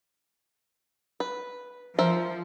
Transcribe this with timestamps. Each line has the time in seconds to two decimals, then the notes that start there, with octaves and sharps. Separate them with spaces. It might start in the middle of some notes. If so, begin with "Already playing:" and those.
1.20 B4
1.99 F3 A#4 C5 E5